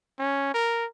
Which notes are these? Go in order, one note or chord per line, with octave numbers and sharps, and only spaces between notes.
C#4
A#4